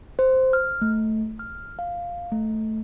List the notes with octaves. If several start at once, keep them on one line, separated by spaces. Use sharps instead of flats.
C5
F6
A3
F6
F5
A3